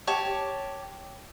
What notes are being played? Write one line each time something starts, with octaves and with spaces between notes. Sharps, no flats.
G4 C#5 A5 D6